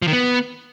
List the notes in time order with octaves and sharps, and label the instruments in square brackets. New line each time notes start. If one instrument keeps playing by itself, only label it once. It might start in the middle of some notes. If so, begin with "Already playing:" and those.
[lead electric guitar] F3
D#3
B3